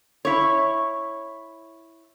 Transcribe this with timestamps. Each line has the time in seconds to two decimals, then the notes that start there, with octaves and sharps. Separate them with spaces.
0.25 E4 C#5